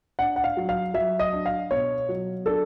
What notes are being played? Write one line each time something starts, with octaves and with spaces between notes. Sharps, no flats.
D4 F#5
F#5
F5
F#3
F5
F#3 E5
D#5
D4
F5
B2 C#5
F#3
D4 A4